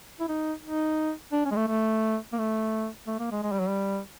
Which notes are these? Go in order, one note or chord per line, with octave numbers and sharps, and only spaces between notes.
E4
D#4
D#4
D4
C#4
G#3
A3
A3
A#3
A3
A3
A#3
G#3
G#3
G3
F#3
G3